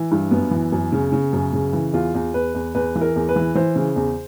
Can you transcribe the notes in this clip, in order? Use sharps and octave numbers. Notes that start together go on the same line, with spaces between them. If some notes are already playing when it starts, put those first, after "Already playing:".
Already playing: E3
G2
F#2 B3
E3
F#2
C#3
C#3
F#2
C#3
E3
E2 F4
E2
E2 B4
E2
E2 B4
E3
A#4
E2
B4
E3
E3 C5
C#3
E2